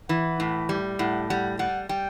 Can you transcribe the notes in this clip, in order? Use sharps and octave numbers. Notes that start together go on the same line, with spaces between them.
E3 F#5
A2
G3
A2 F#5
G3 F#5
G3 F#5
G3 G5